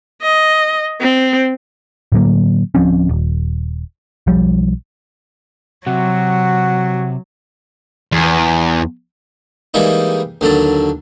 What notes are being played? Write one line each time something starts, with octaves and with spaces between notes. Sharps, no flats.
D#5
C4
A2 D3 F#3 A#3
D1 F3 C4 C#4
D#1
B1 F3 G3
C3 F#3 F#4
E2
E3 G3 G#3 A#3 D#4
D#2 D3 F#3 A5